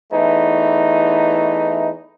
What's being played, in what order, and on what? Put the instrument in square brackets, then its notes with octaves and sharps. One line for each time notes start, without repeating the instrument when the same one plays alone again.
[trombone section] E2 E3 A3 D#4